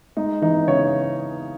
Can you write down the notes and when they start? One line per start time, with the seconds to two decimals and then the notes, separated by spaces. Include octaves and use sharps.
0.17 G#3 D#4
0.42 E3 D#4
0.67 C#3 C#5